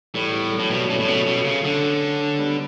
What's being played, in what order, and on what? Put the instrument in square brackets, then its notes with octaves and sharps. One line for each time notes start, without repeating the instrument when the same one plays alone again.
[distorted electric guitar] A2 [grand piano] E3 G3
[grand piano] G3 B3
F#3 A3
[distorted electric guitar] A2
[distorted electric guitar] B2 [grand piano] G3 B3
[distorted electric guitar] A2 [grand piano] A3 C#4
[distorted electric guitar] A2
[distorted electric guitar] B2 [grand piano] A3 C#4
[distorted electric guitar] B2
C#3
D3
[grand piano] G3 B3